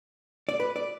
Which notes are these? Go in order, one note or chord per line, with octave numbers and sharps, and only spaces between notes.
D5
B4
D5